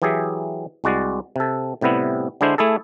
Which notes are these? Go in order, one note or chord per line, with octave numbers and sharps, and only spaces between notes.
E3 F#3 G4 G#4 E5
C2 G#3 F#4 D5
C3 A4
A2 C3 G3 B3 E4
D3 G#3 D4 E4 C5
A3 E4 G#4 A4